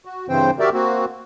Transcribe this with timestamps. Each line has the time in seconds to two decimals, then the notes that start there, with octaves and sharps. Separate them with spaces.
0.05 F#4
0.29 G2 C#3 E3 C4 C5 G5
0.59 F#4 G4 A#4 D5 E5
0.73 A#3 C4 F#4